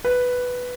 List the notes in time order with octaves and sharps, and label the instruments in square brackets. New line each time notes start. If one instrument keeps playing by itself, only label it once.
[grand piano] B4